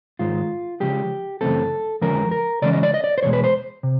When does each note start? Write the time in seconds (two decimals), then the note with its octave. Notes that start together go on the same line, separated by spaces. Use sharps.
0.19 G#2 D#3 G#3 F4
0.80 C#3 F3 G#3 G4
1.41 F#2 C#3 E3 A3 C4 A4
2.02 F2 D3 F3 G#3 C#4 A#4
2.31 A#4
2.62 C#3 E3 G#3 C#4 D5
2.73 D#5
2.83 D5
2.94 D#5
3.04 D5
3.18 C5
3.23 E2 B2 G#3 C#5
3.33 B4
3.44 C5
3.83 C3